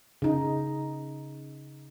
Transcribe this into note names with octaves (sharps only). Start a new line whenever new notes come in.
C#3 D#4